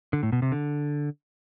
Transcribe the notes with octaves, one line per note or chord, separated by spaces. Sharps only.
D3
A2
B2
C3
D3